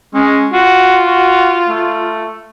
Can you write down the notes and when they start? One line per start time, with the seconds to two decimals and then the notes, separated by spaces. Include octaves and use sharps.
0.14 G#3 C#4
0.53 F4 F#4
1.07 F#4
1.68 A3